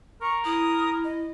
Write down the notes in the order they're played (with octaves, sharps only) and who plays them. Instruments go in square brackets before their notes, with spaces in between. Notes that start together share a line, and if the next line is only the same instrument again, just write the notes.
[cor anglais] A#4 [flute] C#6
[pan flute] E4 [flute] D#6
[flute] D#5